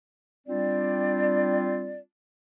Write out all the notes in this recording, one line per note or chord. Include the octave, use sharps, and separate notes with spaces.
G3 C4 D4 F4 D5